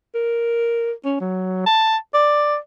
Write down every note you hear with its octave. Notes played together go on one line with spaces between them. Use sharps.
A#4
C#4
F#3
A5
D5